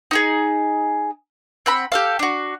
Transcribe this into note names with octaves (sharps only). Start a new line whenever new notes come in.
D#4 G4 G#4
C4 F#5 B5
G4 A4 F5
D4 F#4